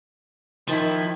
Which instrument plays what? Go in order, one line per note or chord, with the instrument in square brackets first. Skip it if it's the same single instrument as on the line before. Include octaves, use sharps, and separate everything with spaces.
[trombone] D#3 [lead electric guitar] F3 E4